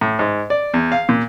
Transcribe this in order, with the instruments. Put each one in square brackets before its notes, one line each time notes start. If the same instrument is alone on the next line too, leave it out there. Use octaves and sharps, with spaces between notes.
[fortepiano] A2
G#2
D5
E2
F5
A#2